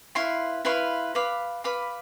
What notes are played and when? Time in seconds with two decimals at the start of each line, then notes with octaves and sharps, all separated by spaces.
0.15 E4 B4 F5 C6
0.65 E4 B4 F5 C6
1.15 B4 F5 B5 D6
1.64 B4 F5 B5 D6